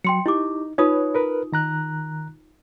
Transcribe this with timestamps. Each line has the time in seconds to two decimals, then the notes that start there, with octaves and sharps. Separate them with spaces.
0.04 F#3 G5 C6 C#7
0.26 D#4 E4 G4 D6
0.78 D#4 F4 B4 C#5 D#6
1.15 A#4 B4
1.52 D#3 A#5 F#6